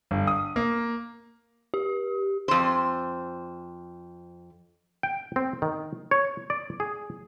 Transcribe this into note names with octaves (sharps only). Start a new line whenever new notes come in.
G1
D#6
A#3
G4
F2 C5
G5
C4
D#3
C#5
D5
G#4